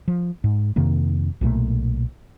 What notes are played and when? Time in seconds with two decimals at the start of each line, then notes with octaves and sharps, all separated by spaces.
0.08 F3
0.44 G#2
0.76 F2 C3 D#3 A#3
1.41 B1 A#2 G3 A3